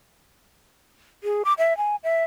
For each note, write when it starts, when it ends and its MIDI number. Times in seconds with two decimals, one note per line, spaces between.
1.24 1.43 68
1.45 1.53 86
1.58 1.76 76
1.77 1.96 80
2.04 2.24 76